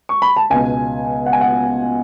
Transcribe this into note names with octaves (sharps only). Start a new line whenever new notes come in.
C#6
B5
A5
C#2 B2 G#5
F#5
G#5
F#5